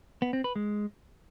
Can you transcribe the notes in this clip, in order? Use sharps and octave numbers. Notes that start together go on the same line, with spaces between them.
B3
C4
B4
G#3